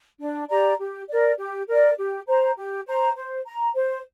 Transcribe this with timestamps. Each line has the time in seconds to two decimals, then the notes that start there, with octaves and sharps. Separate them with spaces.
0.20 D4
0.49 G4 D5 A#5
0.79 G4
1.09 A#4 D5
1.39 G4
1.67 A#4 D5
1.97 G4
2.27 C5 A#5
2.57 G4
2.86 C5 A#5
3.16 C5
3.46 A#5
3.75 C5